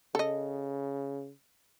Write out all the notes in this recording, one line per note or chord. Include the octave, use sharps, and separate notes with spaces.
C#3 A4 D#5